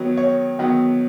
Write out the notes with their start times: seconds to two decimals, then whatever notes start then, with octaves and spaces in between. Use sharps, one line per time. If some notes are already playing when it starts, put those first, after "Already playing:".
Already playing: D#3 F#3 B3 C#5
0.17 C#5
0.59 D#3 F#3 B3